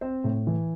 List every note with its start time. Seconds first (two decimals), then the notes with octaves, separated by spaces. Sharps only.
0.01 C4 C5
0.24 A2
0.47 E3